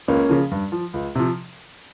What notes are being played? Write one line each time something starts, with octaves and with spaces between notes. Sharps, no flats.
C#2 A#3 C#4
C#3 F3
G2
F3
C#2
C3 F3